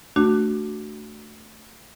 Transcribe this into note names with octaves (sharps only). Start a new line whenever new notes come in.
A3 D4 F#4